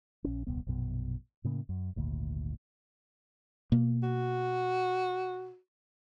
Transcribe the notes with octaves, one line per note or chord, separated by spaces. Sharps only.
A#1 C#4
D#1 C2 B3
A#1 F#2 B2
A2 C#3 A#3
F#2
G#1 D2 A#2
B2 A#3
F#4